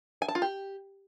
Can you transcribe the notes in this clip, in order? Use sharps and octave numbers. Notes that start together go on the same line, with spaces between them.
G#5
A5
F4
G4